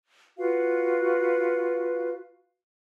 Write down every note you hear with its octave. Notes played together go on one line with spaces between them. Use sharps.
F4 F#4 B4 F5